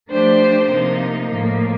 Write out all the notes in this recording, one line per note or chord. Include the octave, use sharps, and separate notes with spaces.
F3 A3 D4 G4 C5
C3 F3 A#3 D#4
A2 F3 A#3